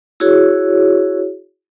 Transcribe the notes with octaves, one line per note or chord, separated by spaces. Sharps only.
E4 F#4 G#4 C#5